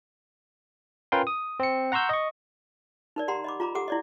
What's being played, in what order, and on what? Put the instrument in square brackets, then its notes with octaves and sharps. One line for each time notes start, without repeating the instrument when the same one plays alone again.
[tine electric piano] C#4 F4 A#4 B4 G5 C6
D#6
C4 C#7
F#5 A#5 C6 C#6 E6 G6
D#5 C#6
[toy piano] D#4 A#4 D5
G4 F#5 A#5 C6
D#5 B5 D6
F4 A#5 B5 D6
G4 A4 F#5 D6 D#6
E4 D5 D#5